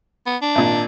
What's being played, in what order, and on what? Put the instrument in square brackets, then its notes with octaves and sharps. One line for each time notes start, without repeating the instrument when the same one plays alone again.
[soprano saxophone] B3
D4
[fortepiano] G#1 A#2